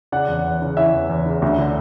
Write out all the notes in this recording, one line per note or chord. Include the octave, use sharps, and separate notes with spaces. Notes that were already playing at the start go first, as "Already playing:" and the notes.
C#3 D5 F#5
E2
E2
C#3
E3 C#5 E5
E2
E2
C#3
D2
D3